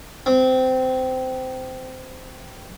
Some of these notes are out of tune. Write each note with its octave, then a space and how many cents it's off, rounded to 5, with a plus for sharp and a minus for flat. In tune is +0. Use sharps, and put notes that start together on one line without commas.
C4 -20